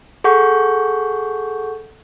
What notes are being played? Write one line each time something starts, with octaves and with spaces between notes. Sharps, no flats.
G#4 A4 F#5 C#6 G6